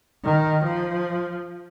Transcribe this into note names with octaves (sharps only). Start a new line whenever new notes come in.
D#3
F3